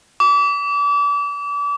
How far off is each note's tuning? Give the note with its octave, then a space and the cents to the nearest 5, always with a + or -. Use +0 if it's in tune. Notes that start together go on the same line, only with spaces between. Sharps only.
D6 -35